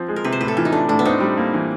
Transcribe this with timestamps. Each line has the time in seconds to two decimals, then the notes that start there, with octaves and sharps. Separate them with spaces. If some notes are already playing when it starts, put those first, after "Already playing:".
Already playing: F3 C4
0.08 G#3
0.16 A#4
0.24 C3 B4
0.32 C5
0.41 A2 B4
0.48 A4
0.57 E3 F4
0.65 D#4
0.72 A3 D4
0.88 A2 D4
0.99 B3
1.05 C4 D#4
1.21 G3
1.37 A#3
1.54 E3